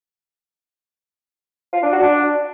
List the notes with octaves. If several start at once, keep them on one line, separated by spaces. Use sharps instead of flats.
F4
D4
F#4
D4